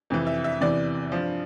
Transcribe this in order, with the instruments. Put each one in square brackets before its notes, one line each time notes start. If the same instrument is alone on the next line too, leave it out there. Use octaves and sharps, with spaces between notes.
[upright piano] F2 C3 E3
E5
E5
E2 C3 E3 D5
G2 F3